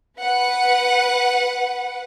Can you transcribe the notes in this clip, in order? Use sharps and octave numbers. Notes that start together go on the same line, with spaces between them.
B4 F#5